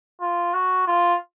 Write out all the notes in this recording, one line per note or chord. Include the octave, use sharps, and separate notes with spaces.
F4
F#4
F4